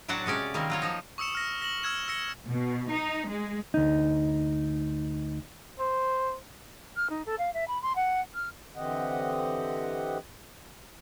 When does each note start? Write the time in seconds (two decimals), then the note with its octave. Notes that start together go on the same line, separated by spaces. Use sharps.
0.08 A2 F#3 D4 F#4 F#5 A5
0.26 C3 G#3 C#4 D5
0.54 D#3 G3 A#3 C4
0.70 F#3 F4 C#5
0.82 F3 D#4
1.18 C#6 D#6 E6 C#7 E7
1.33 D#6 F6 A#6
1.62 A#6 F#7
1.83 E6 F6 G#6 E7
2.08 E6 A#6 C#7
2.48 B2
2.91 D#4
3.29 G#3
3.74 D2 D#4
5.79 C5
6.96 F6
7.10 D#4
7.26 A4
7.38 F5
7.53 E5
7.68 B5
7.82 C6
7.96 F#5
8.34 F6
8.76 D3 E3 C4 G4 D#5 F#5